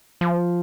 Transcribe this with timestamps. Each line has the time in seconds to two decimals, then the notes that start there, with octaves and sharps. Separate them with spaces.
0.21 F3